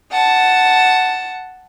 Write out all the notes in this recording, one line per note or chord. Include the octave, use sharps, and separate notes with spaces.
F#5 A5